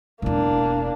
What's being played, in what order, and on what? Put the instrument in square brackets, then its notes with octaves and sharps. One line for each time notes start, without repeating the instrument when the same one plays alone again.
[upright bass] E1 E4 [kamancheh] A#3 D4